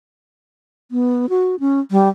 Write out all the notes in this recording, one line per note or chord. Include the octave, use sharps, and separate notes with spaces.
B3
F#4
C#4
G3